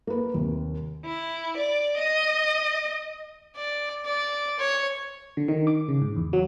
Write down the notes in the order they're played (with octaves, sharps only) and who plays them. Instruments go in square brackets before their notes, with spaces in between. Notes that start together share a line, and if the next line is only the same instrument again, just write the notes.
[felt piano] A#3 B4
D#2 C3
[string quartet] E4
D5
D#5
[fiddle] D5
D5
C#5
[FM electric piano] D3
D#3
D6
C#3
G#2
E2
F#3